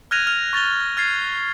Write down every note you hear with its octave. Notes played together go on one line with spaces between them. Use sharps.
F6 F#6 G#6 A#6 D#7 F7
F6 F7
C#6 A6 F7 G7
F6 G#6 A6 C7